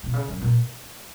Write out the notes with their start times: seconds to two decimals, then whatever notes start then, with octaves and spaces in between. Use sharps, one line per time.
0.03 B2
0.13 C#3
0.27 F#2
0.42 A#2